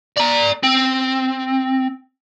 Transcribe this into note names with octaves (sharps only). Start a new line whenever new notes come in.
D5 A#5
C4